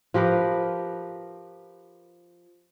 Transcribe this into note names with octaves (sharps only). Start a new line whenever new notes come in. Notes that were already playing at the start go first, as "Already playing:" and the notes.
F3 G4 A#4 B4